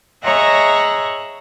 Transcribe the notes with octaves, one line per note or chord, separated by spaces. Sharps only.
G#4 C#5 D#5 E5 F#5 A#5